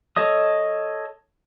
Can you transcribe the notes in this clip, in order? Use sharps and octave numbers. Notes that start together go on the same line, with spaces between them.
A4 C#5 D#5 D#6